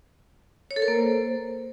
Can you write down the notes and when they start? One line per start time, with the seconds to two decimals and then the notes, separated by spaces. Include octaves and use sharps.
0.71 C#5
0.76 A4
0.82 A#4
0.88 A#3
0.94 C5